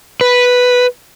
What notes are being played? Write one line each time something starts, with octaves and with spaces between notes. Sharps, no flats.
B4